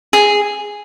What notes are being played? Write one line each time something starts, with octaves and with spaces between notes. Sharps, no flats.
G#4